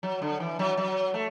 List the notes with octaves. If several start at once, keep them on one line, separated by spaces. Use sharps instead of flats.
F#3
D3
E3
F#3
F#3
A3